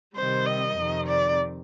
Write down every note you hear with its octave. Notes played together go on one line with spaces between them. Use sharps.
C3 D#3 G3 C5
D#5
F2 C3 D#3
D5